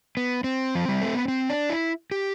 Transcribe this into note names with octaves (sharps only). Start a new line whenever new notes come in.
B3
C4
F3
G3
A3
B3
C4
D4
E4
G4